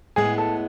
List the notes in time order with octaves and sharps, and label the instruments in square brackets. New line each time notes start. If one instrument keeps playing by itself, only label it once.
[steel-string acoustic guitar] A2 G#3 B3 [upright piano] G#4
[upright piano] A4